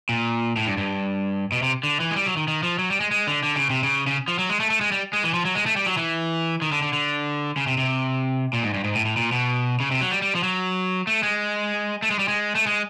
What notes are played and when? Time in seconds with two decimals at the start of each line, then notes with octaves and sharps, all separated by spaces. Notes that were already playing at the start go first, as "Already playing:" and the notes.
0.09 A#2
0.56 A2
0.67 G2
0.77 G2
1.52 B2
1.62 C3
1.83 D3
2.00 E3
2.11 G#3
2.16 G3
2.26 F#3
2.37 D#3
2.48 D#3
2.63 F3
2.79 F#3
2.90 G3
3.00 G#3
3.11 G#3
3.27 D3
3.43 D3
3.56 C#3
3.70 C3
3.83 C#3
4.07 C#3
4.28 F3
4.39 F#3
4.49 G#3
4.60 A3
4.70 A3
4.81 G#3
4.92 G3
5.13 G#3
5.24 E3
5.34 F3
5.45 F#3
5.55 G#3
5.66 A3
5.76 G3
5.87 F#3
5.97 E3
6.62 D#3
6.72 D3
6.82 D3
6.93 D3
7.57 C#3
7.67 C3
7.78 C3
8.53 A#2
8.63 G#2
8.74 G2
8.84 G#2
8.95 A2
9.05 A2
9.17 A#2
9.32 B2
9.80 C#3
9.91 C3
10.01 F#3
10.11 G3
10.22 G3
10.35 F3
10.43 F#3
11.07 A3
11.23 G#3
12.02 A3
12.11 G#3
12.19 G3
12.28 G#3
12.55 A3
12.67 G#3